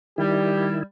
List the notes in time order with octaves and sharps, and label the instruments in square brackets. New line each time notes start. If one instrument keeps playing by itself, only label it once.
[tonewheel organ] D#3 E4 [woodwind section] G3 [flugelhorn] G4